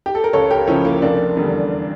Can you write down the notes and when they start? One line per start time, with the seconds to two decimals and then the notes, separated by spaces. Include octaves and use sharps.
0.06 G4
0.15 A4
0.24 A#4
0.33 C#2 A4 C#5
0.51 G4 A#4
0.67 C#3 F3 C#4 E4
0.85 A#3
1.02 F1 A#3 D4
1.36 E2 D3 G3